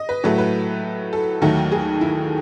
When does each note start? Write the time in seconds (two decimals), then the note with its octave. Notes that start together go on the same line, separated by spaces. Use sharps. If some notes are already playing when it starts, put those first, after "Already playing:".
Already playing: D#5
0.09 B4
0.24 A2 F#3 A3 B4
0.38 B4
1.13 A4
1.42 D#2 D#3 F#3 A3
1.72 G#4
2.01 E4